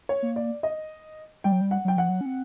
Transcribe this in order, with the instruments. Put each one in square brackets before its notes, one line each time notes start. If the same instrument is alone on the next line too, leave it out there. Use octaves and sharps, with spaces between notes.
[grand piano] C#5
[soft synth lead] A#3
[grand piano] D5
D#5
[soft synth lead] G3 [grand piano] G5
[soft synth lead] F#3
G3
[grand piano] F#5
[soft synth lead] F#3 [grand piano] G5
[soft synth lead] F3 [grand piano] F#5
[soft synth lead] F#3
C#4
C4